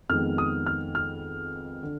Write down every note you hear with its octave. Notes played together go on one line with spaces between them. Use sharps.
F2 D#3 G#3 B3 F6
D#6
F6
F6
D3